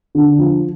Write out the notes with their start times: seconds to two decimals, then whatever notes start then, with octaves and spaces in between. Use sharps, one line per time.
0.15 D3
0.38 F3